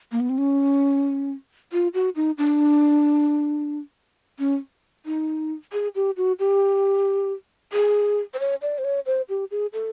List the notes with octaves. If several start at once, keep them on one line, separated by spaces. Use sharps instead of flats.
A#3
B3
C4
C#4
F4
F#4
D#4
D4
C#4
D#4
G#4
G4
F#4
G4
G#4
C5
C#5
D5
C5
C#5
C5
G4
G#4
A4